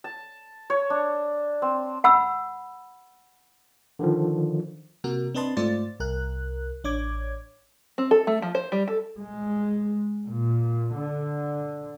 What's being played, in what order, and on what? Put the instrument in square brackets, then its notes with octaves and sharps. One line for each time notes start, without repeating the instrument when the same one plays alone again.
[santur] A5
C#5
D4
C4
[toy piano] F#5 B5 E6
[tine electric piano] D3 D#3 F3
[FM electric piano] C3 A#3 F#4 A#4
C4 D4 B4 D#5 A5 C6
G#2 A3 F4 C5 D5 A6
C2 A#4 F#6
A1 D4 C#5 D6 G#6
[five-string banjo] C4
A4
A3
F3
C5
G3
A4
[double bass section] G#3
A#2
D3